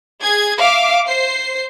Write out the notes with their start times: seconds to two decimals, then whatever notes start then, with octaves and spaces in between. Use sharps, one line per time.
0.22 G#4 G#6
0.61 E5 F5 D6
1.06 C5 C7